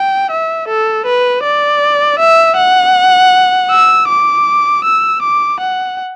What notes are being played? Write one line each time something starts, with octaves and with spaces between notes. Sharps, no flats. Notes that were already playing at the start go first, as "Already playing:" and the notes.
Already playing: G5
E5
A4
B4
D5
E5
F#5
E6
D6
E6
D6
F#5